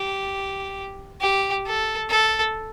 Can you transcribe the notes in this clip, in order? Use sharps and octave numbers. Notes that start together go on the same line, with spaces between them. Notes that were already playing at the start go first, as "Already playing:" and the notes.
Already playing: G4
G4
A4
A4